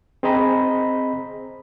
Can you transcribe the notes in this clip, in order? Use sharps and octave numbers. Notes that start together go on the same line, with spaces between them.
C4 G#4 C5 D#5 A#5 B5